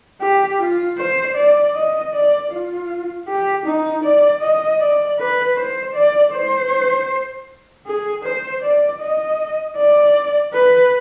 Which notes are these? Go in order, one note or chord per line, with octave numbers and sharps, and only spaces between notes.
G4
F4
C5
D5
D#5
D5
F4
G4
D#4
D5
D#5
D5
B4
C5
D5
C5
G#4
C5
D5
D#5
D5
B4